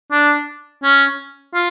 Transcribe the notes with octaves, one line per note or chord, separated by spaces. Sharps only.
D4
C#4
F4